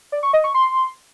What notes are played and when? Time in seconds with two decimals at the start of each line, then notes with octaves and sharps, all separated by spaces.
0.12 D5
0.23 C#6
0.33 D#5
0.44 C#6
0.54 C6